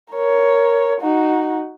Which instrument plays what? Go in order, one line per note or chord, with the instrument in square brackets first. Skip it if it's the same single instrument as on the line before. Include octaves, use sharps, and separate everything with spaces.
[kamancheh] A#4 C#5
D#4 F#4